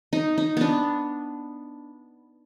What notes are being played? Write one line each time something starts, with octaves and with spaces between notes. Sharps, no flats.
D#4
D#4
B3 D4